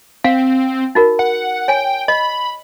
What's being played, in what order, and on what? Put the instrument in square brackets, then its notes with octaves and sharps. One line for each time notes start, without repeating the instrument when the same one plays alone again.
[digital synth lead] C4 [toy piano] F5
[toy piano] D#4 F#4 A#4
[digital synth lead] F#5
[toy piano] C#5 G#5 [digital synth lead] G5
[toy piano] D#5 [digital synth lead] B5